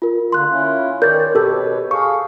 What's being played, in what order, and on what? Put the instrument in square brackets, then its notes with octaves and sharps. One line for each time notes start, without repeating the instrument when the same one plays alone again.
[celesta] F4 A#4
[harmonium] D3 A#3 [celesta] C6 F#6
[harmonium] C#4 E4 F4
[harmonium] D#3 C#5 D5 [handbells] A#4 A6 [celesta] G6
[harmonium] B2 B4 C#5 [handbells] G4 A4
[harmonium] G#4 A4 F5 [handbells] C#6